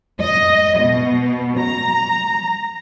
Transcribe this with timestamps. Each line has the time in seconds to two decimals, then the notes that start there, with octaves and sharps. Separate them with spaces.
0.20 D#5
0.78 B2
1.59 A#5